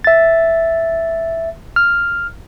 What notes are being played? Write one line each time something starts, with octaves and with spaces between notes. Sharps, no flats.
E5 A6
F6